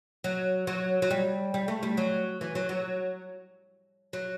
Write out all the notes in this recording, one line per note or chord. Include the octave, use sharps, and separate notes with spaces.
F#3
F#3
F#3
G3
G3
A3
G3
F#3
E3
F#3
F#3
F#3